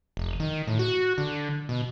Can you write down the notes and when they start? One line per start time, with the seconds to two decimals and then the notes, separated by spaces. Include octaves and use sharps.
0.17 F1
0.40 D#3
0.67 A2
0.79 F#4
1.18 D3
1.69 B2